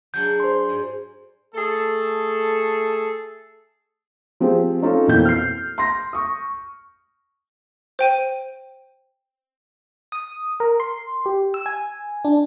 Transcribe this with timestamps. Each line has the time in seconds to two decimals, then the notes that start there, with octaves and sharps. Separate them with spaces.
0.14 F#3 G#3 D4 G6
0.40 C5 C6
0.69 G#2
1.55 A3 G#4 A4
4.40 F3 C4 G4 G#4 C5
4.82 C#4 D#4 F4 A4
5.07 F2 B2 E3 A#3 C4 G6
5.25 F6 C7
5.78 C6 A#6
6.13 C#6 D#6
7.99 C5 G5 D#7
10.12 D#6
10.60 A#4
10.80 C6
11.26 G4
11.54 E6
11.66 G#5
12.24 D4